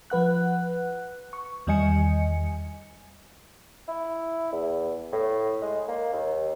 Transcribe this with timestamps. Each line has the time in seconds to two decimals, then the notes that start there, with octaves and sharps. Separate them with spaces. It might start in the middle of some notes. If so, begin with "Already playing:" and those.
0.10 F3 B4 F#5 F#6
1.33 C#6
1.67 E2 D#3 G3 D#5 G#5 C#7
3.88 E4
4.52 E2
5.12 A2
5.62 G#3
5.88 A#3
6.13 D#2